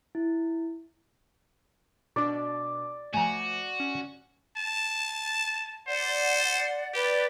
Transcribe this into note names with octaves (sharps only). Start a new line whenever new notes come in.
E4
B2 D4 D5
F3 A3 F#4 G#5 A#5
C#4
A5
C5 D5 F#5
G4 B4 D5